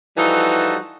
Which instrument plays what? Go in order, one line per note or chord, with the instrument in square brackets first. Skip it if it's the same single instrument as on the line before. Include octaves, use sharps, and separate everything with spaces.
[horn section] E3 F3 G3 D#4 F#4 A4